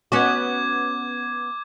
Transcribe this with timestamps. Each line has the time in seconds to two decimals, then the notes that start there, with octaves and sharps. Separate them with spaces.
0.12 B3 C#4 F#4 D6 G#6